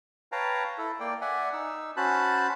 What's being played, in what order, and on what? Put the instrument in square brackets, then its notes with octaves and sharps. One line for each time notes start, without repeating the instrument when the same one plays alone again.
[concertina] B4 C#5 F5 G5 A5 A#5
E4 A4
A#3 D5 G5
D5 E5 F#5 G#5
D#4 E6
C#4 F#4 C5 A5 B5 F#6